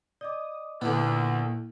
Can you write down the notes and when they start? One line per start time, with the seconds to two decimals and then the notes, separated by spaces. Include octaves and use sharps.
0.21 D5 D#5 D6 D#6
0.82 D2 A#2 D3 B3 E4